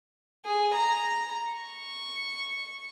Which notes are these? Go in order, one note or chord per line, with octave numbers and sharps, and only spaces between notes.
G#4
A#5
C#6